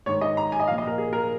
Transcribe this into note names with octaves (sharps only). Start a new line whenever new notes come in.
G#2 D#3 C#5
D#5
A#5
G#5
D#5
A#2 F3 F5
D#5
A#4
G#4
A#4